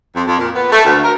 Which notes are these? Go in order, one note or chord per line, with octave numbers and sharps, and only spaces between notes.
F2
F2
A#2
B3
A3
D2
A#4